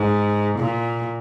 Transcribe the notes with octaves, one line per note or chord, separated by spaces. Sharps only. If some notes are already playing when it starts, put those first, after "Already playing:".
Already playing: G#2
A#2